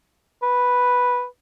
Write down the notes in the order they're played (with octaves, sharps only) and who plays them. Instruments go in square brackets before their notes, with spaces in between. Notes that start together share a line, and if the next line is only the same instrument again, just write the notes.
[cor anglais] B4